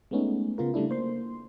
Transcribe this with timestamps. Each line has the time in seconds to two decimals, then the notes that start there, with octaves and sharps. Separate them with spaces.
0.11 G#3 A3 B3 C#4 D#4
0.58 C#3 B3 F4 A#4
0.74 C#3 G3 A3 D4 E4
0.89 A#3 C5 C6